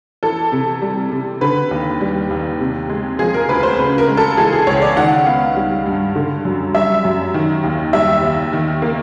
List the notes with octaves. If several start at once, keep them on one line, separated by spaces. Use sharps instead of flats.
E3 A4
C3
G3
C3
D3 B4
D#2
G3
D#2
C3
G#3
F3 G#4
A#4
D2 B4
C5
C#3 B4
A#4
G#3
A4
E3 G#4
G#4
C#2 C#5
D5
D#3 F#5
B3 F5
G3
G2
D3
F#2
G3 E5
F#2
D#3
D#2
G3 E5
D#2
D#3
A#3